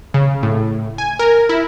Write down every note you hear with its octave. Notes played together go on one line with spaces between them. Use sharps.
C#3
A2
G#5
A#4
E4